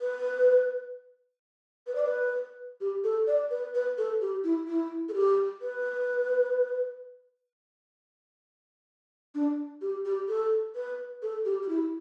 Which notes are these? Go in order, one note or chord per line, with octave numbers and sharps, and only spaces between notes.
B4
B4
D5
B4
G4
A4
D5
B4
B4
A4
G4
E4
E4
A4
G4
B4
D4
G4
G4
A4
B4
A4
G4
G4
E4